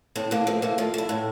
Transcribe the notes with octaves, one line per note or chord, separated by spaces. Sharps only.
A2 C4
A2 A#3
F3 A3
A3 A#3
F3 F4
A3 E4
A2